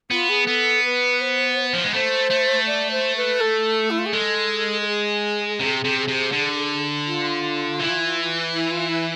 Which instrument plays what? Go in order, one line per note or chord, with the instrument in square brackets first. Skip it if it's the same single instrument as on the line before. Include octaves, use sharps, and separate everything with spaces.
[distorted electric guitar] B3 [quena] F4
[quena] G#4
[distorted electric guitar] B3 [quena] A4
[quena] B4
C5
[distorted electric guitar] F3
G#3
[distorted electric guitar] A3 [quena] C5
[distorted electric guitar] A3
[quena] D5
C5
B4
A4
E4
F4
G#4
[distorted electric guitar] G#3 [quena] A4
[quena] A4
G#4
[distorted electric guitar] C3
C3
C3
D3
[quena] F4
[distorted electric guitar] E3
[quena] E4
F4
E4